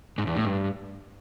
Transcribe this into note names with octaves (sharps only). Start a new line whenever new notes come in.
G#2
E2
A2
G2